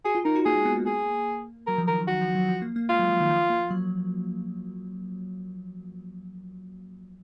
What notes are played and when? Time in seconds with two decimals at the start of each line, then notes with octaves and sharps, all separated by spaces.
0.05 F#4 G#4
0.15 F4
0.25 D#4 A#4
0.35 F#4
0.45 A#3 G#4
0.55 G#3
0.65 B3
0.76 A#3
0.86 G#4
1.67 F#3 A#4
1.78 F3
1.88 D#3 A#4
2.08 D#3 F#4
2.21 F3
2.35 F#3
2.48 F3
2.62 A#3
2.76 A#3
2.89 G#3 F4
2.99 F#3
3.10 F3
3.20 D#3
3.30 F3
3.50 A#3
3.71 F#3